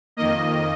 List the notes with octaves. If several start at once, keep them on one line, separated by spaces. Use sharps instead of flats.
F2 D#3 A#3 D#5